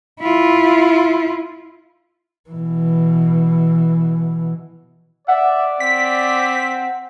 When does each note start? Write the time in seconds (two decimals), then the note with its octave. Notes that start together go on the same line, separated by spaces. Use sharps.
0.20 E4 F4
2.50 B2 E3
5.28 D5 E5 F#5
5.80 C4 B6